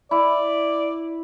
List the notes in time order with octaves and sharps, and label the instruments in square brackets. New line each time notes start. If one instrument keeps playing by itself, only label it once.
[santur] E4 [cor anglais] D5